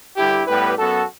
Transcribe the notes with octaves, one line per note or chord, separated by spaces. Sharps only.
G2 D3 G3 E4 G4
A2 G3 B3 G4 B4
F#2 F#3 B3 F#4 A4